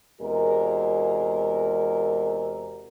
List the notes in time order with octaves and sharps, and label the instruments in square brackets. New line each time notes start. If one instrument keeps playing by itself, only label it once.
[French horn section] E2 C3 G#3 F#4 A#4